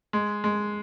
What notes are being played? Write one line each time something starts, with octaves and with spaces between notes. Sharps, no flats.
G#3
G#3